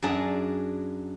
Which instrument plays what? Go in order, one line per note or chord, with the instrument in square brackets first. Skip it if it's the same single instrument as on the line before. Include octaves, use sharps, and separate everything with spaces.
[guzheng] F#2 D4 G#4 A5 A#5